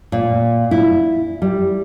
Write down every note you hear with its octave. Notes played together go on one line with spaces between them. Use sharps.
A#2
E4
G3